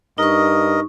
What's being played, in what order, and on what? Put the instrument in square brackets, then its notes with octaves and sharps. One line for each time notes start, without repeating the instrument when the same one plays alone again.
[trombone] G2 [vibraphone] D#4 C#6 [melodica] A#4 D#5